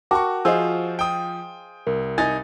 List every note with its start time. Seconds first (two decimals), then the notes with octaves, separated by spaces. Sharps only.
0.11 F#4 A#4 G5 A5 C#6 D6
0.45 F3 F4 G#4 C5 D#5 F5 E6
0.99 G5 D#6
1.87 C2 A#4
2.18 D#4 G#5 A6